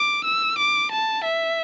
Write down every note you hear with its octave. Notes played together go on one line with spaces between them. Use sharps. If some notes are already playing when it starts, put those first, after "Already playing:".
Already playing: D6
E6
D6
A5
E5